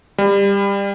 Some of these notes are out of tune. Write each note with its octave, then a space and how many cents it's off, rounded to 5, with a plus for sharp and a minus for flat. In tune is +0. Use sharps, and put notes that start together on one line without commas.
G3 +25